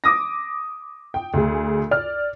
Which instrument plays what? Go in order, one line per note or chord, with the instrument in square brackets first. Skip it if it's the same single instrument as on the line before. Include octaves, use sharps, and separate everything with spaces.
[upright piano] D6 D#6 A#6
[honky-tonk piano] G5
D2 G#4
D5 F6